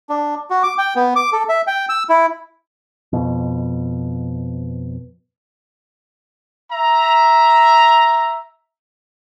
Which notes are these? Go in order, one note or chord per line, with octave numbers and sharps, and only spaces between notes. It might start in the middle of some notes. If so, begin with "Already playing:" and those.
D4
F#4
D6
G5
B3
D6
A4
E5
G5
E6
E4
F2 B2
E5 A#5